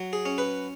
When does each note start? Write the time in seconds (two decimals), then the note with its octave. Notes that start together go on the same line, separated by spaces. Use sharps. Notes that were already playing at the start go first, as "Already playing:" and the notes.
Already playing: F#3
0.13 G#4
0.25 C#4
0.38 B4